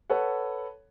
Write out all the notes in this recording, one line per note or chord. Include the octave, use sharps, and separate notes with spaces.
A4 B4 C#5 F#5